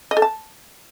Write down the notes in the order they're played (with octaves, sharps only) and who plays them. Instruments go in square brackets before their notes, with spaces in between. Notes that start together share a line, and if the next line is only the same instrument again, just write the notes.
[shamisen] D#5
A4
A5